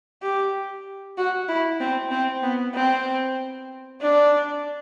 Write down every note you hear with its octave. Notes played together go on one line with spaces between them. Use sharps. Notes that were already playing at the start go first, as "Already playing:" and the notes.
G4
F#4
E4
C4
C4
B3
C4
D4